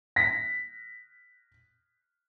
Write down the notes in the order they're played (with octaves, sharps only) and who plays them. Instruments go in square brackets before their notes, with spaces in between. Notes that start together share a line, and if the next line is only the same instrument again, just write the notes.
[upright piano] A#6 B6